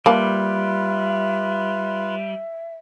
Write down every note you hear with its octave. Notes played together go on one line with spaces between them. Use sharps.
G3 A#3 F4 B4 E5 F5 A5